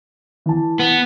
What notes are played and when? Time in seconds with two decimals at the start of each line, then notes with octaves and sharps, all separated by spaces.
0.46 E3 A5
0.80 B3